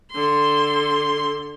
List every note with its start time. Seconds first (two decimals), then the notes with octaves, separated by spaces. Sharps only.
0.12 D3 C6